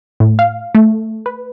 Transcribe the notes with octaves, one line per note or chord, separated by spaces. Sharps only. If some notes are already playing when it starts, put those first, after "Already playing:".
A2
F5
A3
B4